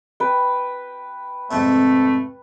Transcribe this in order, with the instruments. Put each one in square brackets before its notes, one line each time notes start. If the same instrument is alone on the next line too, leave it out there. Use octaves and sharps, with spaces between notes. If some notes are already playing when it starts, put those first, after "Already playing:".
[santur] B4 G5
[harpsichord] F2 G#2 C3 [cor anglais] A3